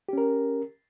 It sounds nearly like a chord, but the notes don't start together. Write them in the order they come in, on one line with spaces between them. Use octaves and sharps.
G4 C#4 A#4